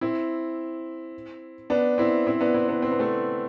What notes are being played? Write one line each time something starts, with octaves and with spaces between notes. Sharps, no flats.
C4 E4
B3 D4
C4 E4
C4 E4
B3 D4
C4 E4
B3 D4
C4
B3
A3 C4